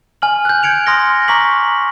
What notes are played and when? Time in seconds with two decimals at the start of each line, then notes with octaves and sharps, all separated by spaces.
0.22 G#5 F6 F#7
0.45 F#6 G6
0.63 G6 G#6 C#7 D7 F7
0.86 C6 D#6 F6 A#6 C#7 G7
1.28 A#5 C#6 D6 B6 F#7